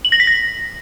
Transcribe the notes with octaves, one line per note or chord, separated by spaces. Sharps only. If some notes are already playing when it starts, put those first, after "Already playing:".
F#7
A#6
B6
A#6